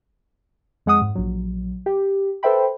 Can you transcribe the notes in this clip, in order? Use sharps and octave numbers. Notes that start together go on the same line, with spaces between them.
F2 G#3 F#5 D#6
G#2
A#1 F#3
G4
A4 B4 C5 E5 G5 B5